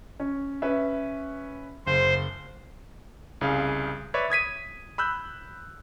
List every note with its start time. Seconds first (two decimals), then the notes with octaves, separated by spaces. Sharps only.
0.20 C#4
0.62 C#4 B4 E5
1.86 F#1 C5
3.41 C2 C#3 G#4 F5
4.14 B4 C#5 D5 E5
4.30 D#6 G#6 B6 D#7
4.98 B5 E6 F#6 G6